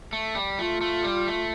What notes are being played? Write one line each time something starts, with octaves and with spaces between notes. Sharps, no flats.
A3
G3
A3 F4
A3
G3
A3